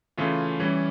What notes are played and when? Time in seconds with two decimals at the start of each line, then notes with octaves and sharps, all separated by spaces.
0.17 C#3 E3 A3 C#4 F4
0.60 E3 G3 C#4 E4